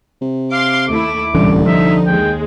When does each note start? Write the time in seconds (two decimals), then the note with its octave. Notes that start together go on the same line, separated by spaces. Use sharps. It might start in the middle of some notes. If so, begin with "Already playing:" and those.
0.22 C3
0.52 F5 C6 D6
0.87 D#2 A3 E4 D6
1.35 D1 C2 A#2 D3 E3 C#4
1.66 F3 D#4 E5
2.07 D#2 G#3 G5